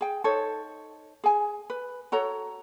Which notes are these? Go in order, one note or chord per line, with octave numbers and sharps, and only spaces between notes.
G#4 G5
D#4 A4 C5 C#5
G#4 G#5
B4
F#4 A4 C#5 A#5